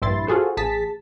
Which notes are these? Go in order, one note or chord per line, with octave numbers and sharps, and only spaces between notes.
A#1 G2 E4 C6 A6
F4 F#4 G#4 A4 C5
A1 G#4 A5 B6